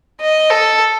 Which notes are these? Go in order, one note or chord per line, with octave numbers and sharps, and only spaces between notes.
D#5
A4